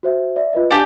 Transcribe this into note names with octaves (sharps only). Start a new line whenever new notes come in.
F#4 C5 E5
D5 E5
F4 B4 D#5
D4 G4 F5 G#5 A5